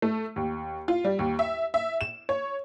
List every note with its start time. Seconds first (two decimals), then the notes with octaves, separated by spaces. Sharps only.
0.02 A3
0.36 D#2
0.88 F4
1.04 G3
1.19 D#2
1.39 E5
1.74 E5
2.01 E7
2.29 C#5